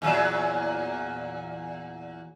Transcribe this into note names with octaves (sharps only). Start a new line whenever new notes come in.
E2 A#2 F#3